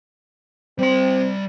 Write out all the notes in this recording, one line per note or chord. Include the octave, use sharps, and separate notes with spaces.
G3 C4 C6